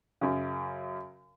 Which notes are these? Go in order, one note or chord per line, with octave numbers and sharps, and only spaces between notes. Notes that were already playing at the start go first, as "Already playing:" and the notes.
F#2 C#3